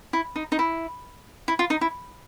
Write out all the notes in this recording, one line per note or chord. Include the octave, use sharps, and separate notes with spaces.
E4
D#4
D#4
E4
E4
F4
D#4
E4